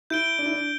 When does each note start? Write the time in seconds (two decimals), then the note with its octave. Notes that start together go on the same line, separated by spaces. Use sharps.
0.10 E4 G6 D7 G7
0.39 D4
0.46 E4
0.53 D4